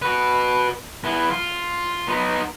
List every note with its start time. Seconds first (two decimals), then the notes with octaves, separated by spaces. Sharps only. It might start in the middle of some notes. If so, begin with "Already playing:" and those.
0.02 F#4 B4
1.04 E3 B3
1.30 F4
2.08 B3 D#4